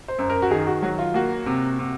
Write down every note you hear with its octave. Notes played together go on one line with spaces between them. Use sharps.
C5
F#2
A#4
F#4
D#3 G#4
F#4
F#3 F#4
F4
A#3 F#4
C3
C3